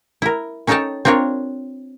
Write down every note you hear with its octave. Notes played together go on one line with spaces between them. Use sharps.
E4 A#4
C#4 D#4 A4 C#5 G5 A5
C4 D4 F4 A#4 C#5